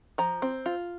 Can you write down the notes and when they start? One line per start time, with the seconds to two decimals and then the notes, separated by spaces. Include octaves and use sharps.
0.18 F3 A#5
0.42 C4
0.66 F4